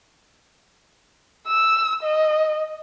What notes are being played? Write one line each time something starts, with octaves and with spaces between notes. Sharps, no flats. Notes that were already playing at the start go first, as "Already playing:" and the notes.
E6
D#5